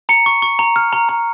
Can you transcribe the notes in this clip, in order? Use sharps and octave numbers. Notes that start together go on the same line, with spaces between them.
A#5 C#7
C#6
C#6
A#5
F6
A#5
A#5